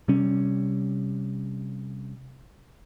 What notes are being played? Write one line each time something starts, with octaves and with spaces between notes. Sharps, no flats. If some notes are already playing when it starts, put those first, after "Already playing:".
C3 G3 C#4